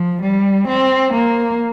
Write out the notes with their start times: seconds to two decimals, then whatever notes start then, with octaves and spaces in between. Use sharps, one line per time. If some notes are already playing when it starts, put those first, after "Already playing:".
Already playing: F3
0.23 G3
0.68 C4
1.14 A#3